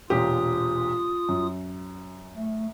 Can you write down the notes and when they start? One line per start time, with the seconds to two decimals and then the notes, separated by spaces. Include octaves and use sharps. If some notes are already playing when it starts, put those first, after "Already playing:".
0.10 E1 A#2 F4 G4 D#6
1.29 F#2
2.36 A3